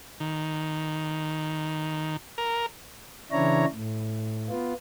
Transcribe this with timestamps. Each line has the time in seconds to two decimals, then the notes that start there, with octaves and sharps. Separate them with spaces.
0.20 D#3
2.38 A#4
3.32 C#3 E3 D4 E4 C#5 A#5
3.73 A2
4.50 B3 F4